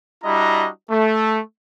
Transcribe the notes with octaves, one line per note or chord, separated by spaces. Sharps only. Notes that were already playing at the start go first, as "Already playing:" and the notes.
G3 D4 E4 F#4 D#5 A#5
A3